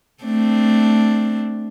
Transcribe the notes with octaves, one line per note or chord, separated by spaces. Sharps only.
A3 C4 D4